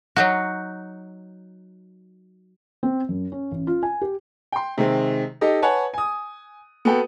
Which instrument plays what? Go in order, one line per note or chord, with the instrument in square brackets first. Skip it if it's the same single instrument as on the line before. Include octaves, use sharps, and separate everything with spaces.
[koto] F#3 D#4 F#4
[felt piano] C4
F#2
C#4
A1
F4
G#5
G4
[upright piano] G5 C6
C3 D#3 G#3 C4
D#4 G4 A4 D#5
B4 C#5 F#5 G#5 A5
G#5 D#6
B3 F#4 A4 G5